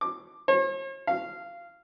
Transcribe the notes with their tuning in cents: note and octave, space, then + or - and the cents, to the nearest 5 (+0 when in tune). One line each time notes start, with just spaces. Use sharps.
D6 +10
C#5 -45
F5 -15